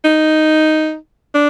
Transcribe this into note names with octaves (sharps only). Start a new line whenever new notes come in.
D#4
D4